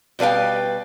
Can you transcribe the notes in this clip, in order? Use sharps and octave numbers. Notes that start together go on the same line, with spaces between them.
B2 G3 B4 F5 G5